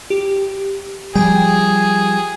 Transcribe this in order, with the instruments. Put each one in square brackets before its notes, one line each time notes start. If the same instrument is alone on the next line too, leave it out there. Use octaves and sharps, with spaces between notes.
[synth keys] G4
[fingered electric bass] F3 G3 [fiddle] G#4 [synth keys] G5